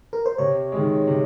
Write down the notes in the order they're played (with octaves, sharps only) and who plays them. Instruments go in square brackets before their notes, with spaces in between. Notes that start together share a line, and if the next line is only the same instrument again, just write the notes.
[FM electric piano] A#4
C5
[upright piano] C3 [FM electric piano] C#5
[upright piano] D#3 G#3
C3